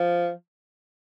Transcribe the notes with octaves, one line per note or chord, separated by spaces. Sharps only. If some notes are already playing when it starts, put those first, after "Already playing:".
Already playing: F3